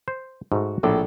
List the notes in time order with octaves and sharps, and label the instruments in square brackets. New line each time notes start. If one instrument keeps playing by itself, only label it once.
[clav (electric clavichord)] C5
[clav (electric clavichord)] G#2 A3 [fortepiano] F#4
[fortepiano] A#1 A4 D6 [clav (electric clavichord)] A2